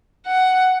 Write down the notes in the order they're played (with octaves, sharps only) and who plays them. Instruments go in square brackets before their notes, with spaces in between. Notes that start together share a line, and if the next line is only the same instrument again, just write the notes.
[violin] F#5